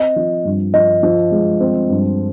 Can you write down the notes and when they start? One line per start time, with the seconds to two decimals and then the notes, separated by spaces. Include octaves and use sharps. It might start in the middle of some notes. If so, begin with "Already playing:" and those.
Already playing: C4 D#5
0.16 F3
0.45 G2
0.74 F3 D#5
1.03 F3
1.32 G#3
1.60 C4
1.90 G2